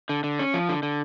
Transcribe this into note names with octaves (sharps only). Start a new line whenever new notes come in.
D3
D3
C#4
F3
D3
D3